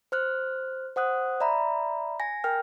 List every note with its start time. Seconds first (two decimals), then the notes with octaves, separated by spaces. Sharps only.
0.12 C5 F6 F#6
0.96 C5 F#5 D#6 F#6
1.40 D5 E5 A#5 B5
2.20 G#5 A#6
2.44 A#4 G5 F6